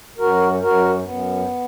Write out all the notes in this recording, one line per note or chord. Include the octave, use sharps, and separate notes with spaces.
F#2 F#4 A#4
F#2 F#4 A#4
F#2 B3